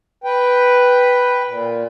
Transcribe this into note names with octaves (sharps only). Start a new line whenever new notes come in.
B4 G5
A#2